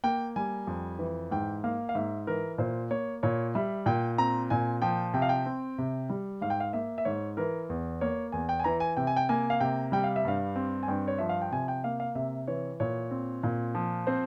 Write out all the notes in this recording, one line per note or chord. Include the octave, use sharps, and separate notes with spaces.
A#3 G5
G3 G#5
F2
E3
G#2 G5
A#3 F5
F5
G#2 E5
E3 A#4
A#2 C5
A#3 C#5
A#2 C#5
G3 E5
A#2 G5
C4 A#5
A#2 G#5
F3 G5
C3 G5
F5
G5
C4
C3
G3
G#2 F5
G5
F5
A#3 E5
E5
G#2 C#5
E3 A#4
E2
A#3 C#5
E2 G#5
G5
G#5
E3 A#5
G#5
C3 G5
G#5
G5
A#3 G#5
F5
C3 G5
G3 G5
F5
E5
G2 F5
C4
G#5
G2 G5
C#5
F3 E5
F5
G5
C3 G#5
G5
A#3 F5
F5
C3 E5
E3 C#5
A#2 C#5
C4
A#2
F3
C4 C5